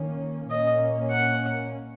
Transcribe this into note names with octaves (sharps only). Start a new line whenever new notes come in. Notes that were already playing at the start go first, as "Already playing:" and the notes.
Already playing: D#3 A#3 C#4
A#2 A#3 C#4 D#5
F#5